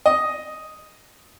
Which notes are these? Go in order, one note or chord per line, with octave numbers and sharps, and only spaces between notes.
D#5